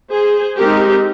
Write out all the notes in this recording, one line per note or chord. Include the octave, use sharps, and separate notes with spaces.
G#4 C5
G#3 C4 D#4 G4 A#4